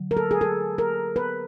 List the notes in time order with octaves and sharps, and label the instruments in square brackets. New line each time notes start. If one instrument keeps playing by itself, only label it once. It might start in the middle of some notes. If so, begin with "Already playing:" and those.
Already playing: [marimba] D3 F#3
[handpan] A#4
A4
G#4
A4
A#4
B4